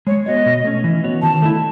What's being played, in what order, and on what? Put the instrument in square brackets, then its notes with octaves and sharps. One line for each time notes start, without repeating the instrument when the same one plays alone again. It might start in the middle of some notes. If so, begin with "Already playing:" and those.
[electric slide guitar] G#3 [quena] C#5
[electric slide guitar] B3 F#4 C#5 [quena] D#5
[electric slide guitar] B2
A3 C#4
E3
B3 F#4 C#5
[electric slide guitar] D#3 [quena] A5
[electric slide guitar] A3 E4